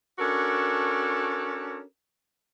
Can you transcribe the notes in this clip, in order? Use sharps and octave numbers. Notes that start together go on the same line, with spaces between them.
C#4 D4 F#4 A4 A#4